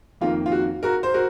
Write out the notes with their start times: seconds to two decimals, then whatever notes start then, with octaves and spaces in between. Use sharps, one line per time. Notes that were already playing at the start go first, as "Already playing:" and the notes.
0.21 F2 D#3 A#3 F4
0.46 F4
0.52 F#4
0.83 F#4 A#4
1.03 C5
1.14 F#4 A#4